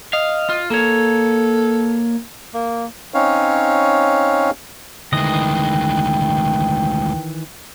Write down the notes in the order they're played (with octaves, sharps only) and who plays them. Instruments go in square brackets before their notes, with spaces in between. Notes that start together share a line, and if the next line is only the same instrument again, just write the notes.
[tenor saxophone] D#5 [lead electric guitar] F5
[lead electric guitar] F4
[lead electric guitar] A#3 C#5 [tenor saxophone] A4
[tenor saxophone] A#3
[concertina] C4 C#4 D#4 C#5 F5
[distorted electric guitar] D2 G#3 [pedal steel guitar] D#3 E3 D#5 [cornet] G5